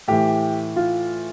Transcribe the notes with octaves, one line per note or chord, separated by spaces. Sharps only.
A2 E3 G4
F4